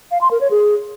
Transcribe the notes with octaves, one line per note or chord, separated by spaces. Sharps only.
F5
C6
A#4
C#5
G#4